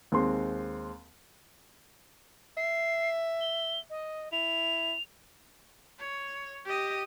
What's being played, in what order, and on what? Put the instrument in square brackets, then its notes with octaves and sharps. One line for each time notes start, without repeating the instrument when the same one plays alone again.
[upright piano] D#2 G#3 C4 C6
[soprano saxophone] E5 [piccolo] C7
[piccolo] G7
D#5
[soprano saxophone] E4 [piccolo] F7
[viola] C#5
G4 D#5